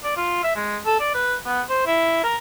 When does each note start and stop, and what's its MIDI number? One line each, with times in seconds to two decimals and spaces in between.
0.03 0.14 74
0.16 0.43 65
0.43 0.53 76
0.56 0.78 56
0.86 0.98 69
1.00 1.11 74
1.14 1.35 71
1.46 1.61 59
1.69 1.82 72
1.87 2.21 64
2.24 2.37 70